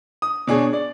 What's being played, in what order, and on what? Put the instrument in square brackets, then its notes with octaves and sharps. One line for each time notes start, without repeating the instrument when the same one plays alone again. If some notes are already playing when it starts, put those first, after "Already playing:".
[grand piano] D#6
B2 D4 G#4 C#5
D5